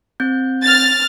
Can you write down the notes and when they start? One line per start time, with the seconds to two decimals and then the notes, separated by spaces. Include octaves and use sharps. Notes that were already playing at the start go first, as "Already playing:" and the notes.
0.20 C4 G6
0.63 F6 A6